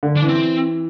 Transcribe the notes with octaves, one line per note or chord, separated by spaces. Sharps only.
D3
D4
E3
C4